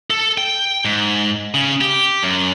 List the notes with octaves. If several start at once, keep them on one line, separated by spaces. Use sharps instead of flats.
A4
G5
G#2
C#3
G4
F#2